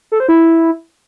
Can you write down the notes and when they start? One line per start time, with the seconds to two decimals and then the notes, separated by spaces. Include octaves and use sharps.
0.12 A4
0.20 C5
0.29 E4